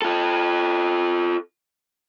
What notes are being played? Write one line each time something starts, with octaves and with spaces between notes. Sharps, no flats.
F4 A4